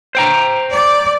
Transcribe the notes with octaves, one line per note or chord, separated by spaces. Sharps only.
C5 G5 A#5
D5